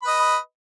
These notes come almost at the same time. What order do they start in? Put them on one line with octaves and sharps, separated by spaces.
B5 B4 D#5